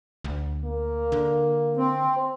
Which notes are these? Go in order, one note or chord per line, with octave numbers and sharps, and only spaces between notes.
D2
A#3
D3
C4